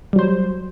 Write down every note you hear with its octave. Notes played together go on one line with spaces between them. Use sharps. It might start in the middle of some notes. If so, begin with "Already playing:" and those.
F#3 G3 C5